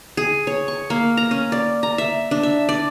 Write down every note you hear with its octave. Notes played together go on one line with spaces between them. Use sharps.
G#4
C#5
C#6
A#3
A#5
C#4
D5
A#5
E5
D4
E5
D5